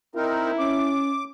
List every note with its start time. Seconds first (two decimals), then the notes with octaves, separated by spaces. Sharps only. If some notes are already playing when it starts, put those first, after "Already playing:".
0.15 C4 D#4 E4 A#4
0.58 C#4 D6